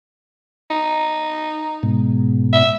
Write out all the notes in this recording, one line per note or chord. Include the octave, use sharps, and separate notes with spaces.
D#4
G#2 B2
E5